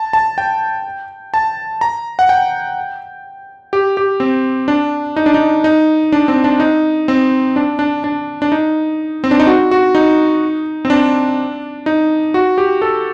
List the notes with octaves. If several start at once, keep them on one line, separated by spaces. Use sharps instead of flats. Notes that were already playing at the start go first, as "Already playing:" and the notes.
Already playing: A5
A5
G5
A5
A#5
F#5
G5
G4
G4
C4
D4
D#4
D4
D#4
D#4
D4
C4
D4
D#4
C4
D4
D4
D4
D4
D#4
C4
D4
D#4
F#4
F#4
D#4
C4
D4
D#4
F#4
G4
A4